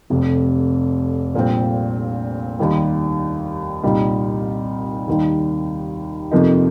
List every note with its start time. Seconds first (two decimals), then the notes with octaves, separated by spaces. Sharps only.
0.10 F1 F2 C3
1.35 A#1 A#2 G3 C4
2.59 D#2 D#3 G3
3.83 C2 A#2 G3 D#4
5.08 D#2 D#3 G3
6.31 F2 C3 F3 A#3 D#4